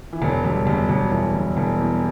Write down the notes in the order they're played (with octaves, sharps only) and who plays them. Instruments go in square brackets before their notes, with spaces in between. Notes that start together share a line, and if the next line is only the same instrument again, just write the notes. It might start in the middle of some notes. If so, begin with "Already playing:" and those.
[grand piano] E3
[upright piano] E1 [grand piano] F#3
[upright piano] E1 [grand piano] G3
[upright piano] E1 [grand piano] G3
[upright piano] E1 [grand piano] F#3
[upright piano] E1 [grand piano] E3
[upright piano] E1
E1
E2